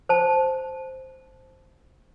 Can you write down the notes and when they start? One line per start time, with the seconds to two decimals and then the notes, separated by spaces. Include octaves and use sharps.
0.09 C5 A5